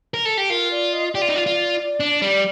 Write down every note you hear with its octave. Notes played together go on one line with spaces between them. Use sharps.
A#4
A4
G4
F4 A#4
D5
D#5
D#5
G4 D5
F4
D#4
F4
F4
D4
G3